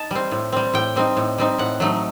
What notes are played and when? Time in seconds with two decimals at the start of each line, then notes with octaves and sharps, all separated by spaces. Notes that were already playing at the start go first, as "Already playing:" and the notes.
Already playing: D#4 A5
0.11 G3 C4
0.32 A2
0.52 G3 C4
0.74 A2 G5
0.96 G3 C4 D#4
1.17 A2
1.38 G3 C4 D#4
1.58 A2 F#5
1.80 F#3 A3 D#4